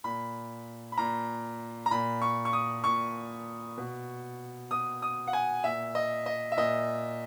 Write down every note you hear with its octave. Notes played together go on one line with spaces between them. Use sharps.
A#2 B5
B5
A#2 A#5
A#5
A#2 B5
C#6
C#6
D#6
A#2 C#6
B2
B2 D#6
D#6
F#5
G#5
A#2 E5
D#5
D#5
E5
A#2 D#5